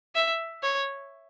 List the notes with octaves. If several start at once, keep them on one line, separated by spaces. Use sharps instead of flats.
E5
C#5